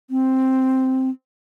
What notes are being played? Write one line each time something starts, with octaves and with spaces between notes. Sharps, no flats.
C4